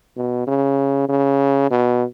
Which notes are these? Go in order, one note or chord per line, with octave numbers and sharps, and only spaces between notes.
B2
C#3
C#3
B2